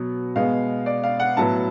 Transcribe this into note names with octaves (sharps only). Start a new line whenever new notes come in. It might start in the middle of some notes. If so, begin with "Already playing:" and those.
Already playing: B2 F#3 B3
B2 G#3 B3 F5
D5
F5
F#5
A2 F#3 B3 A5